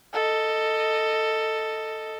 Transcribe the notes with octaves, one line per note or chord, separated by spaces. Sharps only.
A4 D#5